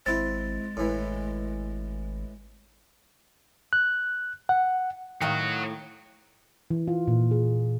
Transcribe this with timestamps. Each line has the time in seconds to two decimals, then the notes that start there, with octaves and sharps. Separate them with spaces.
0.06 G#1 G#3 C4 E4 A6
0.77 G#1 A2 E3
3.73 F#6
4.49 F#5
5.22 A2 D#3 C#5 D#5 F5 F#5
6.70 E3
6.88 F4
7.08 A#2
7.31 G#4